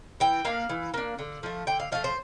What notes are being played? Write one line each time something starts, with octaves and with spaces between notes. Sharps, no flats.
E3 G5
A#3 D4 F5
E3
A#3 D4
D3
F3 A3
D3 G5
F5
F3 A3 F5
C5